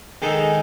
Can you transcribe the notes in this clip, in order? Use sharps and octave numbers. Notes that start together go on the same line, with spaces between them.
D#3 G#3 D#4 A4